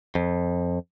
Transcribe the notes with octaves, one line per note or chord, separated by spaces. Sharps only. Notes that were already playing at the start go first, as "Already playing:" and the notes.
F2